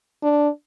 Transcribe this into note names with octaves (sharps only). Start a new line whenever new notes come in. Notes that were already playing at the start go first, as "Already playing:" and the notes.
D4